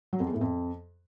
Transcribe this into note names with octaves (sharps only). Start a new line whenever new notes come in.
F#3
F2
E2
A2
F2